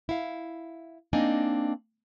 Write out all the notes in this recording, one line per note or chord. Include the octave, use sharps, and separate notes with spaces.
E4 F5
A#3 C4 D4 D#4 D#5 G#5